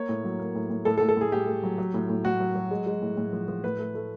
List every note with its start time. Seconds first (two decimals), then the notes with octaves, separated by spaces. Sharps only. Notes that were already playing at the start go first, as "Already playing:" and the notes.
Already playing: A#3 C#5
0.09 A2
0.24 F#3
0.39 A#3
0.55 A2
0.70 A2
0.85 A2 A4
0.98 A4
1.01 A2
1.09 A4
1.17 A2 G#4
1.32 A2 G4
1.47 A3
1.63 F#3
1.78 F#3
1.94 A2
2.09 A2
2.25 A2 F#4
2.40 F#3
2.55 F#3
2.71 G#3
2.86 G#3
3.02 A2
3.17 A2
3.33 F3
3.48 F3
3.64 A2 B4
3.79 A3
3.95 A3